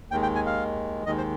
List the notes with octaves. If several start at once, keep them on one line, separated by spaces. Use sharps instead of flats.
D#2 D#3 G#3 G5
G5
G#5
F5
D#2 D#3 G#3 D#5
C5